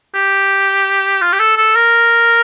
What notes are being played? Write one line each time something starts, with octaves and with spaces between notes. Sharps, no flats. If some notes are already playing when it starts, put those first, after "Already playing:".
G4
F4
G4
A4
A4
A#4